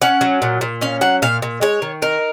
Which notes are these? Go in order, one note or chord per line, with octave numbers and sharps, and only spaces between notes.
C#4 F#5
F#3
A#2
A#2
C#4 F5
F#3 F#5
A#2 F5
A#2
G#3 C#5
D#3
D#4 A#4